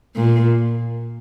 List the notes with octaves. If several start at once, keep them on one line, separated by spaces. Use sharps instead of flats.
A#2